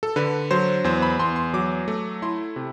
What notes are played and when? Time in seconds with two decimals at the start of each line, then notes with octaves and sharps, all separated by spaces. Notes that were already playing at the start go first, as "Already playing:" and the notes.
0.03 A4
0.16 D3 B4
0.51 F#3 C5
0.84 E2 C5
1.02 B5
1.19 E2 C6
1.36 C6
1.54 F#3 D6
1.88 A3
2.22 E4 C6
2.56 C3